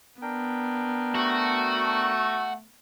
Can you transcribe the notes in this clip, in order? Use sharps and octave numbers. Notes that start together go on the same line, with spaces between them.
B3 D4 A#4 G5
A3 F#4